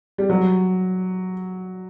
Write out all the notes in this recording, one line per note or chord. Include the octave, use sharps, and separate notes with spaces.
G3
F#3